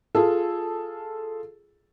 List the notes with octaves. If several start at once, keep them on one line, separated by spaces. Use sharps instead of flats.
F4 G#4 A4